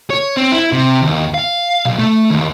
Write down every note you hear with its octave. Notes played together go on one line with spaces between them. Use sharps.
C#5
C4
E4
C3
D#2
F5
B1
A3
D#2